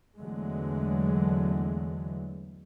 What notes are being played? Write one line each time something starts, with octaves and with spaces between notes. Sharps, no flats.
E2 D3 E3 F#3 G#3 A3